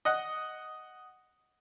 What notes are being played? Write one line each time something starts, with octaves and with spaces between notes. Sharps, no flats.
D#5 F#5